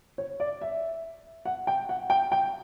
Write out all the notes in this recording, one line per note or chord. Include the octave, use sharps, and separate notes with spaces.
C#5
D5
E5
F#5
G5
F#5
G5
G5